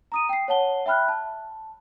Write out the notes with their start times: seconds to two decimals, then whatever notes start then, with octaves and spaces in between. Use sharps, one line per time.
0.12 A#5 D#6 D#7
0.29 G5 C7
0.48 C#5 F#5 A5 G7
0.86 E5 G5 B5 F6 F#6
1.08 A5